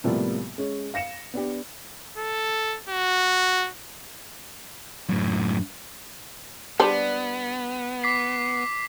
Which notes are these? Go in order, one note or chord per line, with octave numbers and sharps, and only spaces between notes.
A2 C3 F3 G3 A#3 B3
G#3 C#4
F5 A#6 C#7 E7
B3 D4 G4
A4
F#4
F#2 A2
G3 B3 D4 C5
D6 B6 C7